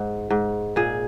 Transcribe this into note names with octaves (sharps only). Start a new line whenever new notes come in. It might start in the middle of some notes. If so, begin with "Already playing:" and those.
Already playing: G#2
G#2
A#2 G#4